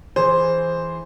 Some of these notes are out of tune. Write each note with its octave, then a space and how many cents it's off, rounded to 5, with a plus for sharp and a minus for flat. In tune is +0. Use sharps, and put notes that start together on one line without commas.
E3 +0 G#4 +0 C5 +0